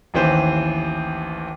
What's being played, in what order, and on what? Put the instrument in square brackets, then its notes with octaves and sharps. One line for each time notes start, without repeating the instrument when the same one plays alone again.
[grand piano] A1 D#2 E3 C5